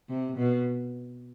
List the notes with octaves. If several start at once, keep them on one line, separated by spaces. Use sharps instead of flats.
C3
B2